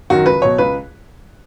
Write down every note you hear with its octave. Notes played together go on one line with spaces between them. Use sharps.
F#2 D#3 F#3 F#4
C#2 B4
B2 F#3 C#5
C#2 B4